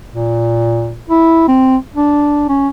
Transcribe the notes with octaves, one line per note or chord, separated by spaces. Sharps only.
A#2
E4
C4
D4
C#4